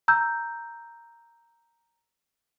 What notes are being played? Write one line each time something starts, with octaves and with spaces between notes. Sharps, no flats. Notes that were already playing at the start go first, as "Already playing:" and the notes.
A#5 E6 G6